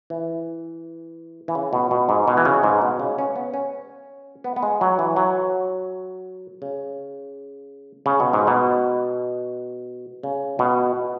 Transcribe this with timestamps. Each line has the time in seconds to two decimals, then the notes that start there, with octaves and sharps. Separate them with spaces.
0.10 E3
1.48 E3
1.55 C#3
1.73 B2
1.91 B2
2.09 G#2
2.28 B2
2.37 E3
2.45 C#3
2.63 G#2
2.82 B2
3.00 C#3
3.18 C#4
3.36 B3
3.54 C#4
4.44 B3
4.56 B3
4.63 G#3
4.81 F#3
4.99 E3
5.16 F#3
6.62 C#3
8.06 C#3
8.20 B2
8.33 G#2
8.47 B2
10.23 C#3
10.59 B2